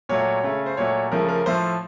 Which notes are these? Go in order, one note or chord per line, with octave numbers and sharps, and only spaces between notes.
A#2 F#3 A3 C#5
C#3 A3
C5
A#2 F#3 A3 C#5
C#3 F3 A3 A#4
A#4
A2 F3 A3 C5